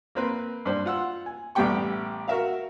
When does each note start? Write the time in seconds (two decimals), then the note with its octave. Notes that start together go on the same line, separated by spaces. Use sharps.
0.15 A#3 C4 B4
0.65 G2 C5
0.86 F4 F#5 E6
1.26 G#5
1.55 A1 G3 B3 G4 G5 C#6
2.28 F#4 A#4 E5 F5